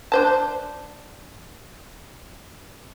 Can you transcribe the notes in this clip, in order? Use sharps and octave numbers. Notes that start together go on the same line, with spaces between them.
D4 C5 A5